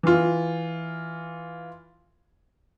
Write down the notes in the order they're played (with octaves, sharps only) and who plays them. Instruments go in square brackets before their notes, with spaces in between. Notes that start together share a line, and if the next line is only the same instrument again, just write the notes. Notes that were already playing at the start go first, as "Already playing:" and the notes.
[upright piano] E3 F4